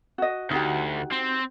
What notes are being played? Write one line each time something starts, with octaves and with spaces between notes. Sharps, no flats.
F#4 D#5
D2 D#4 F#4 G4
C4